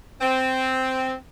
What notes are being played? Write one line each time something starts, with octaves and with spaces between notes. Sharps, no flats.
C4